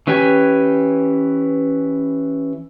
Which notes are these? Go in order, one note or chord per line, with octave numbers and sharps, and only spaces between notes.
E3 C#4 G4 B4 G#5